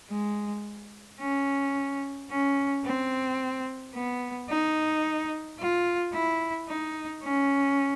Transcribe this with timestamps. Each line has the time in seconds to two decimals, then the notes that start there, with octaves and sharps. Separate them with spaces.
0.10 G#3
1.20 C#4
2.31 C#4
2.85 C4
3.94 B3
4.50 D#4
5.59 F4
6.14 E4
6.68 D#4
7.23 C#4